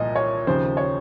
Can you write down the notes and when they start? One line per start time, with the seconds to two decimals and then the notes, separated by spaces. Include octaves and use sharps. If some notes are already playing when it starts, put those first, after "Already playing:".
Already playing: C2 A#2 F3 D#5
0.15 C#5
0.47 D#2 C#3 F3 C5
0.77 C#5